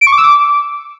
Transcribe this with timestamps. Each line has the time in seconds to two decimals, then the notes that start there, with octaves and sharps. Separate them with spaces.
0.01 D7
0.07 C#6
0.12 D6
0.18 E6
0.23 D6